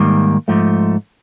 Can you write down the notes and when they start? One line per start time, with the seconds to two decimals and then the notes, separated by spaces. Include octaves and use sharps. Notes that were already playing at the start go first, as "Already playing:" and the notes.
Already playing: G#2 D#3 G3 A#3
0.48 G#2 F3 A3